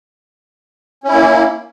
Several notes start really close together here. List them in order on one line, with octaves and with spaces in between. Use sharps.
C#4 E4 A#3